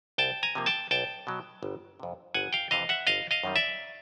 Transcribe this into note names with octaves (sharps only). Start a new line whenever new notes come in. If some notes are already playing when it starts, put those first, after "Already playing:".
C2 G5 A5
G#5 A#5
C3 F3 A#3
G5 A5
B1 G5 A5
B2 F#3
G1
F2 C3
G1 F#5 G#5
F5 G5
F2 C3 E3 D#5 F5
E5 F#5
G1 D#5 F5
D#5 F5
F#2 D#3 G3 C4
D5 E5